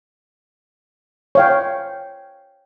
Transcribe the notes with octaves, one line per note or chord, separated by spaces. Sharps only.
C#5 F5 G5